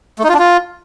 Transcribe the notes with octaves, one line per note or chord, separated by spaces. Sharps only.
A3
D#4
F4
D4
F4